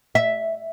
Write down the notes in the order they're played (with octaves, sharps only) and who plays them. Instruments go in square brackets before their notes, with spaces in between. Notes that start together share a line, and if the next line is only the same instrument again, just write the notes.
[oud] E5